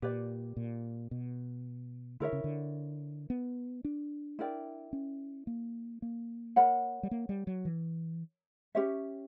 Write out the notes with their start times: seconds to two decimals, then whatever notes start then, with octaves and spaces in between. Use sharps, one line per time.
0.02 A#2 G4 B4 D5
0.57 A#2
1.11 B2
2.20 D3 E4 A#4 C#5 E5
2.33 C#3
2.44 D3
3.30 B3
3.85 D4
4.39 E4 A#4 D5 G5
4.93 C#4
5.47 A#3
6.02 A#3
6.56 A#4 C#5 F#5 B5
7.03 G3
7.11 A#3
7.29 G3
7.47 F#3
7.65 E3
8.75 C#4 G4 C#5 E5